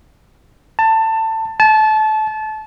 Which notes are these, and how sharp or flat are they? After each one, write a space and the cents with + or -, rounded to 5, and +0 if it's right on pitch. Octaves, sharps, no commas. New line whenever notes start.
A5 +20
A5 -25